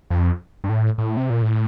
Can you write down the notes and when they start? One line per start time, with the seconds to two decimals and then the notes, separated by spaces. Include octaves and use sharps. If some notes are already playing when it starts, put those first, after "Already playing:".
0.10 F2
0.64 G2
0.69 A2
0.98 A2
1.17 C3
1.30 A#2
1.42 A2